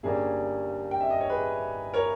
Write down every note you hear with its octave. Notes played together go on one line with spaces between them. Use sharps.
G1 G2 G3 A#3 C#4 G#4
G5
E5
D#5
C#5
G#4 B4
A#4 C#5